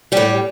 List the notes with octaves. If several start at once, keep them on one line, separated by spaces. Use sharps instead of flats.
A2 G3 G4